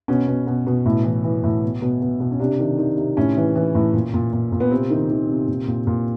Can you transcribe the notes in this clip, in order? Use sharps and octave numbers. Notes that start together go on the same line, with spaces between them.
B2 C#4
B2
B2
B2
A2
E3
E3
A2
B2
B2
B2
B2
C#4
C3 D4
D#3
D#3
C3
A2 C#4
E3
E3
A2
A#2
A#2
A#2
A#2
B3
C3 C4
D#3
D#3
C3
A#2
A#2
A#2